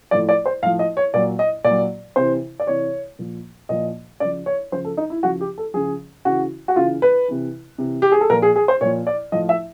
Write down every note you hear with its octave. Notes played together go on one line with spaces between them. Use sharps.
A2 F3 D5
D5
C5
A2 F3 F5
D#5
C#5
A#2 F#3 D5
D#5
A#2 D5
F#3
C3 E3 C5
D5
C3 E3 C#5
A#2 F3
A#2 F3 D#5
C#3 F3 D5
C#5
C#3 F3 C5
A4
D#4
E4
C#3 F3 F#4
G4
A4
C#3 F3 G#4
C#3 E3 F#4
F#4
C#3 E3 F4
B4
C3 E3
C3 E3
G4
G#4
A4
A#2 F3 A#4
G#4
G#4
C5
A#2 F3 C#5
D5
A2 F3 D#5
E5